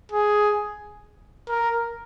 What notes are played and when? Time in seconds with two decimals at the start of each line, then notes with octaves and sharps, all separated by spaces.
0.12 G#4
1.48 A#4